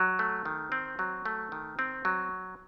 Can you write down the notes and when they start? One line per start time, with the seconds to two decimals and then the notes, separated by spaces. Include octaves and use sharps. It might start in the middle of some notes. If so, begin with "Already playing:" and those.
Already playing: F#3
0.19 A3
0.45 D#3
0.72 C4
0.99 F#3
1.25 A3
1.52 D#3
1.79 C4
2.05 F#3